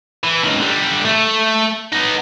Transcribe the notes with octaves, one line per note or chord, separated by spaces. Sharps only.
E3
C#2 D#3
D3 G3
A3
B3 D#4